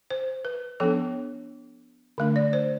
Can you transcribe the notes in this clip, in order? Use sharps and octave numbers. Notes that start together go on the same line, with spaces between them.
C5
B4
F3 B3 D4 A4
D3 A3 D4
D5
C5